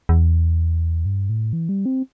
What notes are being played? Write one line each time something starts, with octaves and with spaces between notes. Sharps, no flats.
E2
G2
A2
E3
G3
C4